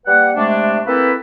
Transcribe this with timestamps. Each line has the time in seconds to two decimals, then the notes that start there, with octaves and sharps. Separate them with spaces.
0.06 G3 A#3 B4 F#5
0.36 C3 G#3 A3 D4
0.86 A#3 C4 E4 A4 B4